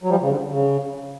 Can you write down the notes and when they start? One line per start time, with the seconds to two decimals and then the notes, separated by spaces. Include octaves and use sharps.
0.03 F#3
0.10 F3 G3
0.22 C#3
0.30 D3
0.52 C#3